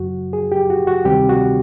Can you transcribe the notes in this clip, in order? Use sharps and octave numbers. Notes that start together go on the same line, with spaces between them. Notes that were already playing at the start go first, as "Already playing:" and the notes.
Already playing: F#2 C#3 F#3 F#4
G#4
G4
F#4
F#4
D2 C3 D#3 G3 C4 G4
F#4